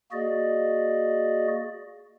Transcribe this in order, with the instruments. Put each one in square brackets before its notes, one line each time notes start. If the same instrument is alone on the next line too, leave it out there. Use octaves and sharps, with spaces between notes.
[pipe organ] A#3 F#4 G#4 D5 D#5